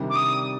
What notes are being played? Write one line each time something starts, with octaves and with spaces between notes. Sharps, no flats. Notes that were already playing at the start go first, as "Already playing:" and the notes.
Already playing: C3 D#3 G3 D4
D6
D#6